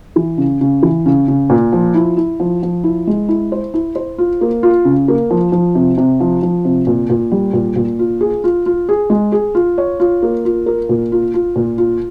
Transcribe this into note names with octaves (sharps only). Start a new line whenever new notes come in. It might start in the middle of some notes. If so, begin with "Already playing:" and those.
E3
C#3
C#3
E3
C#3
C#3
A#2
F3
E4
E4
F3
F3
E4
G#3
E4
C5
E4
C5
F4
A#3
F4
C#3
A#3
F3
F3
C3
C3
F3
F3
C3
A#2
A#2
G3
A#2
A#2
F4
G#4
F4
F4
G#4
G#3
G#4
F4
C#5
F4
A#3
F4
A#4
A#2
F4
F4
A#2
F4